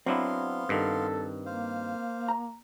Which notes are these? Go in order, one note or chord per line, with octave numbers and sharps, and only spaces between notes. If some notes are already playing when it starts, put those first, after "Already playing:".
F#3 B3 C4 D4 E4 F5 C6
G2 D#3 A4
A#3 C5 F5
A#5